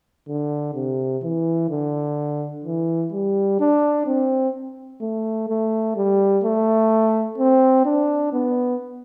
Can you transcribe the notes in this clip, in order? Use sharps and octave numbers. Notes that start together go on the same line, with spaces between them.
D3
C3
E3
D3
E3
G3
D4
C4
A3
A3
G3
A3
C4
D4
B3